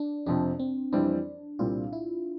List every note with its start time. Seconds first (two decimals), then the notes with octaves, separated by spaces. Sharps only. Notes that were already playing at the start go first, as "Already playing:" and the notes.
Already playing: D4
0.26 F2 C3 F3 C4 D4
0.59 C4
0.93 F2 E3 G3 C4 D4 E4
1.59 C2 A#2 G3 C4 E4 F4
1.93 E4